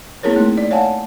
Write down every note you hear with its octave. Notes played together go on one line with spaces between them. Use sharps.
A#3 C4 E4 G#4 A#4 C#5
A3 C4 D#4
D5
C#5 F5 F#5 G#5 A5